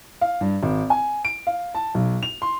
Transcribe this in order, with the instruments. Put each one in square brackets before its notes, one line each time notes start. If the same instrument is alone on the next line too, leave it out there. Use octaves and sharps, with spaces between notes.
[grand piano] F5
G2
G#1
G#5
D7
F5
A5
B1
F7
C6